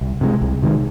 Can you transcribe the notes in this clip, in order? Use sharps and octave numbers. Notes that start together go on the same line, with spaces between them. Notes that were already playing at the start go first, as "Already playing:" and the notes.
C2
C3 D#3 G#3
C2
C3 D#3 G#3